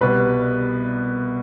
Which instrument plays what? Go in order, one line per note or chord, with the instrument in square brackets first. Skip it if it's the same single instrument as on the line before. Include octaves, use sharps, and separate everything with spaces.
[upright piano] C2 B2 G3 B4